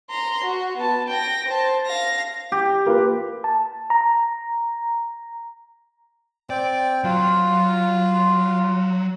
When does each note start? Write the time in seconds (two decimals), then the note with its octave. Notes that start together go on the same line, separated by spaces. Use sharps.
0.10 A#5 C6
0.44 F#4
0.77 B3 A5
1.09 G5 A#6
1.49 C5 A5
1.86 F5 A#6
2.52 G4
2.86 A#3 F4 B4
3.44 A5
3.90 A#5
6.50 C4 D5 G5
7.04 F#3 F4